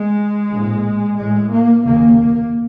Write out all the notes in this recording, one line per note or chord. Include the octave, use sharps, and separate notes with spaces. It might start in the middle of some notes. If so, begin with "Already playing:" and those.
Already playing: G#3
A#1 A2
A1 A2 G#3
A#3
F1 D#2 C#3 A#3